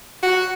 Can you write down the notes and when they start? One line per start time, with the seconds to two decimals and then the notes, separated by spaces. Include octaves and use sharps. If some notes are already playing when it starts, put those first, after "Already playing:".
0.23 F#4